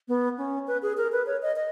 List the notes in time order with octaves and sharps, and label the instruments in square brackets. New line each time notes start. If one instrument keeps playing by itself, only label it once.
[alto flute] B3
C#4
B4
G#4
A#4
B4
C#5
D#5
D#5